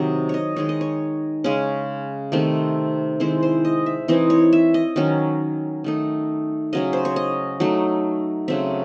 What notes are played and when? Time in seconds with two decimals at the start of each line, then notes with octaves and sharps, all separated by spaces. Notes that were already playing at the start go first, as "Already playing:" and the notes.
Already playing: C3 D#3 F#3 D#5
0.29 C#5 D#5
0.56 D#3 G#3 D#4 C#5
0.69 D#5
0.81 C#5
1.44 C#3 G#3 C#4
2.32 C3 D#3 A3 C4
3.20 D#3 G#3 C4 E4 C5
3.43 C5
3.65 D#5
3.86 E5
4.08 E3 C4 D#4 D#5
4.30 C#5
4.53 E5
4.74 D#5
4.96 D#3 F#3 C#4
5.84 D#3 A3 D#4
6.73 C#3 F#3 C#4 D#5
6.93 C5
7.05 C#5
7.16 D#5
7.60 F#3 A3 D#4
8.48 C#3 F#3 A3 C4 E5